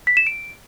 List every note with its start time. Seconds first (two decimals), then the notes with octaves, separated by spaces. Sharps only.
0.07 B6
0.17 E7
0.27 D7